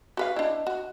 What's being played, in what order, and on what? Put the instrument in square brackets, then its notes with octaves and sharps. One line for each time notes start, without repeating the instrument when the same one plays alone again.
[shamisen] F#4 B4 F5
[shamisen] D4 E4 [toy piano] D#5
[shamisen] F#4